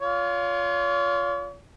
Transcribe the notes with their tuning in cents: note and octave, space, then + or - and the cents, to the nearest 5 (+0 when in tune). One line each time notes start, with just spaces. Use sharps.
F4 +5 C#5 +45